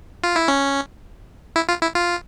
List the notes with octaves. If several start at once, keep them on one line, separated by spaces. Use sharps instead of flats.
F4
E4
C#4
E4
F4
E4
F4